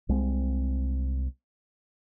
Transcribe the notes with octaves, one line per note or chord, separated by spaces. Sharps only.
C2 G#3 C4